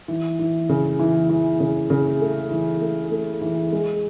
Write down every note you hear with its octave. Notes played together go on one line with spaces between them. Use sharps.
E3
E3
C#3
E3
E3
C#3
C#3
A3
E3
A3
A3
E3
G#3